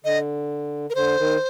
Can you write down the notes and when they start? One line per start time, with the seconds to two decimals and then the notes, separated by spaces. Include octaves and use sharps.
0.05 D3 D#5
0.90 A#4
0.95 D3 C5
1.18 D#3